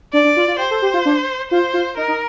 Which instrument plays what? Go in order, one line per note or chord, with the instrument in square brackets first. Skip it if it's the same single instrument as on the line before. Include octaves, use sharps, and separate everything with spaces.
[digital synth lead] D4 [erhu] D5
[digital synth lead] D4
F4
F4
[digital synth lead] G4 [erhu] C5
[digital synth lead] A4
G4
F4
D4
[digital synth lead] F4 [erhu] C5
[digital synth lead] F4
[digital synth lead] D#4 [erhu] A#4
[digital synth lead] D#4